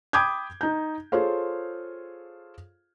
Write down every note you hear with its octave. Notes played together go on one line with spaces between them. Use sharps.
G5 B5 D6 D#6 G6 G#6
D#4 A#5 G6
F4 G#4 A4 C5 C#5 F5